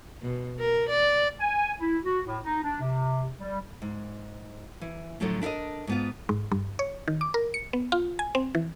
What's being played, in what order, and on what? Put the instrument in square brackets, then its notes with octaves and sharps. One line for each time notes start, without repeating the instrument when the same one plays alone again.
[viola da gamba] B2
A#4
D5
[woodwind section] G#5
E4
F#4
A2
D#4
D4
C3
G3
[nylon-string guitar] G#2
E3
A2 D3 F3 F#3 A4
D4 E4 A4 A#4 D#5
G#2 B3 F4
[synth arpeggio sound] G#2
G2
C#5
D#3
D6
A#4
C#7
B3
F4
G#5
C4
E3